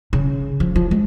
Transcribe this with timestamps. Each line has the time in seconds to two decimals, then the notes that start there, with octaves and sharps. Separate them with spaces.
0.13 C#3
0.60 F3
0.76 F3
0.91 G#3